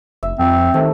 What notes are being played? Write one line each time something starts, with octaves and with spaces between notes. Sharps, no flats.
F1 E5
F2 C4
C3 D#3 A3